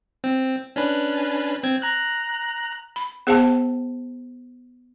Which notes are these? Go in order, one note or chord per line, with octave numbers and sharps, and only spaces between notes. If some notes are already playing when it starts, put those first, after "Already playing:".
C4
C#4 D4 B4
C4 G#6
A#5 F#6
B5
B3 G#4 C5 F5 G5 A5